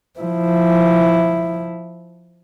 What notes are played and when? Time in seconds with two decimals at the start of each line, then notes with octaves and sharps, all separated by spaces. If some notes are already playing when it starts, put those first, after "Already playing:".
0.19 F3 E4